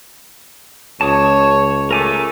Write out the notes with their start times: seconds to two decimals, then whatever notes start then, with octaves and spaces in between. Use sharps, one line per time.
1.01 C#2 C#5 A5 D6 D#6
1.91 A3 A#4 G#5 D6